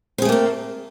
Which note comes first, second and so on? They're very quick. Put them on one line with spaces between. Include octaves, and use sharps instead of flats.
C4 G#4 A3 A#3 A4